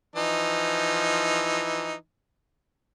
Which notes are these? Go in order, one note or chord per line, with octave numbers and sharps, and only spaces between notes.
E3 F3 D#4